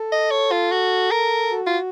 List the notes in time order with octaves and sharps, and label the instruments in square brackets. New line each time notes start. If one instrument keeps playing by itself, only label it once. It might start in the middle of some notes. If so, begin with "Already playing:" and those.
Already playing: [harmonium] A4
[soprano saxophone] D#5
C#5
F4
F#4
A#4
[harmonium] F#4
[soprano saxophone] F4